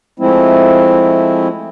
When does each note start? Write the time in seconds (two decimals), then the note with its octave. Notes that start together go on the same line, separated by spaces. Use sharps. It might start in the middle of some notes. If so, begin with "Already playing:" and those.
0.20 F3 G#3 A3 C4 E4